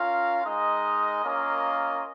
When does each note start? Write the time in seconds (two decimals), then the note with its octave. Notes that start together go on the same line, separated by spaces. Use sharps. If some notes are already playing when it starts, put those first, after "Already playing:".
Already playing: C#4 F4 A#4 F5
0.44 G#3 D#4 A#4 D#5
1.24 A#3 C#4 F4 A#4 D#5